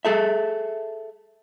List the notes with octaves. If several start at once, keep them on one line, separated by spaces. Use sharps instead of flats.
G#4 A4 E5